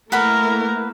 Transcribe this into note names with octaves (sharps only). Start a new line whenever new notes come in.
A3 A#3 E4 A#4 B4 F#5 B5